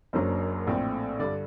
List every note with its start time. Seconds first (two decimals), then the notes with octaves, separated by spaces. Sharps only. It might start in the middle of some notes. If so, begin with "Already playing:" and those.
0.13 F#1 F#2 F#3 A#3 D4 C5
0.67 A#1 A2 A3 C4
1.19 G2 D3 D5